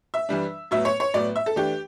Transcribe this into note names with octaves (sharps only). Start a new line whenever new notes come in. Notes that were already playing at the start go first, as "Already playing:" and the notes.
E5
E3 G3 D4
A2 F#3 B3 E5
C#5
C#5
A2 F#3 B3 D5
E5
A4
E3 A3 D4 G4